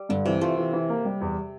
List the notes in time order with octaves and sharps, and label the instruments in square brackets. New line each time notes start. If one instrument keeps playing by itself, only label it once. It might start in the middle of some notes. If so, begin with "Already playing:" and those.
Already playing: [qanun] G3
[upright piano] G2 [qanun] D3
[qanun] C3 [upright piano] E3
[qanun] A3 [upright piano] F4
[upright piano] E3
E3
A#3
G3
E2